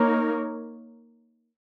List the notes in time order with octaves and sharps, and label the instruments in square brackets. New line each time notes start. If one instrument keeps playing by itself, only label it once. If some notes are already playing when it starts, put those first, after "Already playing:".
Already playing: [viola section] A#3 D#4 A#4 C#5